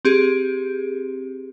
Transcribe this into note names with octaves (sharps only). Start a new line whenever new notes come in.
C4 G4 G#4